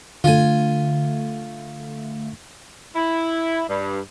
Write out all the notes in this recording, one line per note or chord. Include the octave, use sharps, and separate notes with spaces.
D3 A3 F4 G#5
E4
G2